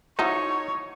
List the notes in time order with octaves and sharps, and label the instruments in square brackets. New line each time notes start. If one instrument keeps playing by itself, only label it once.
[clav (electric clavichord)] D#4 [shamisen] E4 F#4 C5 [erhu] C#5 [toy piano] A#5